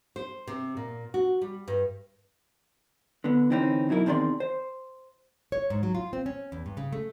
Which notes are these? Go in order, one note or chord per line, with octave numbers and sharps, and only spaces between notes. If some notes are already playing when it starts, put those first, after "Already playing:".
C5
C3
A#2
F#4
G3
G2
D3 B3
D3 E3 C4 C#4 D#4
B2 F#3 D#4 E4 A#4
E2 C3 D#3 A#4 D5 C6
C5
C#5
G#2
F#3
F4
C4
C#4
E2
G2
C#3
A3